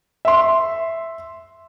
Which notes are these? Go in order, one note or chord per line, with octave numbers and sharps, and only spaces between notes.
E5 C6